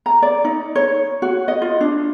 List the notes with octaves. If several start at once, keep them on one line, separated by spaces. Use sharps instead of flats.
A#5
D5
D#4
C#5
F#4
D#5
F4
D4